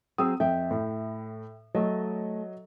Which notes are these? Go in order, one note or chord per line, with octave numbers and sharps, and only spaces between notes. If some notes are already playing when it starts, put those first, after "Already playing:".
F#3 C4 G#4 D#6 E6
F2 E5 G5
A2
F#3 A3 C#5 D#5